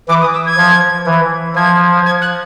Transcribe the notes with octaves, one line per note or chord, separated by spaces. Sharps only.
E3 D6
D#6
E6
G#6
F3
E3
F3 G#6
G#6
F#6